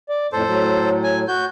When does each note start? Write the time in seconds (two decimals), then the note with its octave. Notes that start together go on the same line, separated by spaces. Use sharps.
0.09 D5
0.32 F2 A2 A4 C5
0.47 A2 F#3
1.03 G#5
1.28 F#4 G6